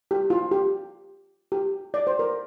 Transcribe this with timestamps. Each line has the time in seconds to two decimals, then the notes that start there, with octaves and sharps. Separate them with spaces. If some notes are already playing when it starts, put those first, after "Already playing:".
0.11 G4
0.30 F4
0.51 G4
1.52 G4
1.94 D5
2.07 C5
2.19 A#4